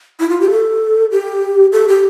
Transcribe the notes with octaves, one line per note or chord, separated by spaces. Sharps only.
E4
F4
G4
A4
G4
A4
G4